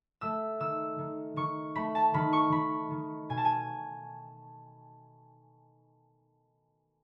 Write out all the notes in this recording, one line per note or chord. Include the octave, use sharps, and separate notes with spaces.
A3 E6
D#3 E6
D#3
D#3 C#6
A3 B5
A5
D#3 B5
C#6
D#3 B5
D#3
B2 G#5
A5
G#5